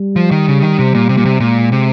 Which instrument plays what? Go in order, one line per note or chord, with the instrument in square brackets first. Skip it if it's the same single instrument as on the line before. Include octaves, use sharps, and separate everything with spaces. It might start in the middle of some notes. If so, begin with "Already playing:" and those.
Already playing: [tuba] G3
[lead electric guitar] F3
D#3
C#3
D#3
C3
A#2
C3
A#2
C3
[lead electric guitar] A#2 [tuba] G#3
[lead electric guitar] C3